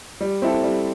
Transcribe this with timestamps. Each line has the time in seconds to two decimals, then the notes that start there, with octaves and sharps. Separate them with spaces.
0.21 G3
0.42 C4 E4 A4
0.63 G3